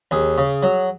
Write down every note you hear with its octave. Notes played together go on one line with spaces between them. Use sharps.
D#2 G#4
C#3
F#3